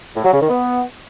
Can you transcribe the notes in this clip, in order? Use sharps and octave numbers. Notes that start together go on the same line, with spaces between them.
A2
F#3
C#3
D#3
B3